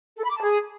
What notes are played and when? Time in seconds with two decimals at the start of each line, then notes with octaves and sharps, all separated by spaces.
0.17 A4
0.23 B5
0.30 D6
0.36 A5
0.42 G#4